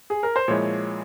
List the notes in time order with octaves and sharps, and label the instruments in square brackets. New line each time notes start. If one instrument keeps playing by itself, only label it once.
[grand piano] G#4
A#4
C5
[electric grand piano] A#2 F3 G#3 E4 [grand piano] C#5